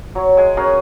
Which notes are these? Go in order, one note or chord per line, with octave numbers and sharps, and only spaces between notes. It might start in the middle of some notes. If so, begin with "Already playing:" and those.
F#3 C#5
G#3 G#5
C#4 F#4 G#4 A#4